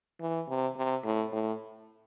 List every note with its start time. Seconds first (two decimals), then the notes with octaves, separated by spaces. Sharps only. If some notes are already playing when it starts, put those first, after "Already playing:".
0.20 E3
0.48 C3
0.76 C3
1.04 A2
1.32 A2